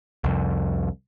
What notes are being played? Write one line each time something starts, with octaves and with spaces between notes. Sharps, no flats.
C2 F2